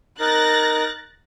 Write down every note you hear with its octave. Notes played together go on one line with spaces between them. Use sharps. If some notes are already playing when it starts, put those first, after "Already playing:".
D#4 A#4 F#6 A6 A#6